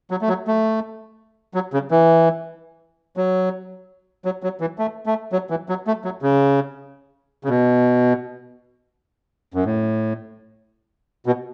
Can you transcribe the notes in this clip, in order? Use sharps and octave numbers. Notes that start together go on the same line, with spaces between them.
F#3
A3
F#3
A3
F#3
C#3
E3
F#3
F#3
F#3
E3
A3
A3
F#3
E3
F#3
A3
F#3
C#3
C#3
B2
F#2
A2
B2